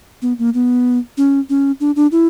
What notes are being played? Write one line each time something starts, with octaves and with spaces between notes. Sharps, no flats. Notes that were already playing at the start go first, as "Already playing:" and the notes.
B3
A#3
B3
C#4
C#4
D4
D4
E4